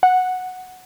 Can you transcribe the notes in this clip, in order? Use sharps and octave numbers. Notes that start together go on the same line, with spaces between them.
F#5